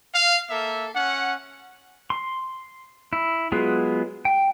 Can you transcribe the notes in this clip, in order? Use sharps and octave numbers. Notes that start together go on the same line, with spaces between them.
F5
A#3 A4 E5
C#4 F#5
C6
E4
F#3 G#3 B3 F4 G#4
G5